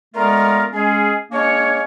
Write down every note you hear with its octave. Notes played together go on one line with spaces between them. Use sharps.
D3 G#3 A3 B3 F4 A#4
G#3 C#4 G#4
G#3 A#3 C#4 D4 C#5